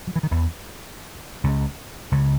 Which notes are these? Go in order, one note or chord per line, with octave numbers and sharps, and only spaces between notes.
F#3
E3
D#3
E2 E3
C#2 C#3
C#2 C#3